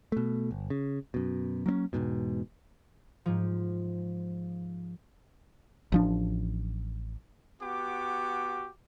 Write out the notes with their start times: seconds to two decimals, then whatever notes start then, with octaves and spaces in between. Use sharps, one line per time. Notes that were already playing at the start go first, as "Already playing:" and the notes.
0.12 B2 A3
0.51 G1
0.70 C#3
1.14 F#2 B2
1.66 F#3 A#3 C4 C#4
1.93 E1 A#1 G#2 B2
3.26 G#2 F3
5.92 A1 F3 D4
7.60 B3 F#4 G4 D6